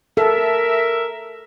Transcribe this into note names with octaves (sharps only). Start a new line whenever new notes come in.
A4 A#4 E5